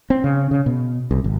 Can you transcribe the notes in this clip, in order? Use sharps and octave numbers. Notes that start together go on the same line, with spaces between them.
C4
C#3
C#3
B2
C2
G#1